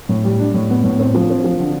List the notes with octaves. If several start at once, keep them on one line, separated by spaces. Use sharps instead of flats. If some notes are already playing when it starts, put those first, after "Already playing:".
A2
G3
D4
A2
B3
A2
C4
F3
C4
F3
D3